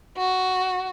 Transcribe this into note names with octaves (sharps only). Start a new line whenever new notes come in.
F#4